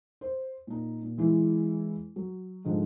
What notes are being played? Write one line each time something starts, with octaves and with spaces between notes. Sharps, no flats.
C5
A#2 D#4
A#2
E3 G#3 E4
F#3
G#2 D3 D#3 F3